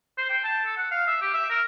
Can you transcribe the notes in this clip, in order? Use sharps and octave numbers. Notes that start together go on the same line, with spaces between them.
C5
G5
A5
A4
F#5
F5
E5
G4
E5
A#4